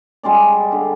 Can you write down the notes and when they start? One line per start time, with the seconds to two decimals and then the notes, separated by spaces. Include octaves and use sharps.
0.23 G3 G#3 C#4 D5
0.72 D3